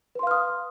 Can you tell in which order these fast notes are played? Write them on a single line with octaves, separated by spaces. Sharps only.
B4 C6 F5 F6 D#6